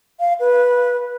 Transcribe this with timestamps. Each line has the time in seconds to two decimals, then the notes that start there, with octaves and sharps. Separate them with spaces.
0.20 F5
0.40 B4